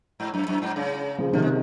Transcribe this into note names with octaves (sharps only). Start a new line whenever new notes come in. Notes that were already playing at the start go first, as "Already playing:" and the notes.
G#2
F#2
F#2
G#2
C#3
C#3 F3
C3 D#3 F3
G#3